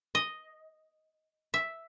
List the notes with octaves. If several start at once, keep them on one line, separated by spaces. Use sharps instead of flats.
D#5
E5